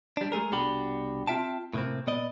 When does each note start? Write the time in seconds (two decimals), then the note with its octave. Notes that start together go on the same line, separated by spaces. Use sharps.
0.17 G3 D4
0.32 G#3 A3 G#4 A#4
0.51 C2 B2 D4 F#4 G4 B5
1.27 C4 F4 E5 G5 A5
1.73 A2 C3 A3 A#3 C4
2.07 A#2 B3 D5 D#5